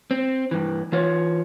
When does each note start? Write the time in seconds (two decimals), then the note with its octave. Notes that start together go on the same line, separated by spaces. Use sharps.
0.11 C4
0.51 G2 E3
0.92 E3 F4 C#5